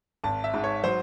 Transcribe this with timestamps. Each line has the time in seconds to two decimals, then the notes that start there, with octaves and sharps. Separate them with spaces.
0.24 G#1 A5
0.44 E5
0.54 G#2
0.64 C#5
0.84 F#3 C5